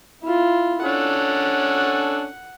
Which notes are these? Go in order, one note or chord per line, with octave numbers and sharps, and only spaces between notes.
E4 F4
C#4 D4 A4 F#5